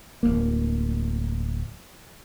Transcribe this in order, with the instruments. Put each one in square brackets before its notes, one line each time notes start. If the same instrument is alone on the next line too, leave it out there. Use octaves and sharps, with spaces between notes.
[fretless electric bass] D1 G#1 A#3